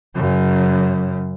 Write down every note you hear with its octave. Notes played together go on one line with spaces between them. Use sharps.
F#2 C#3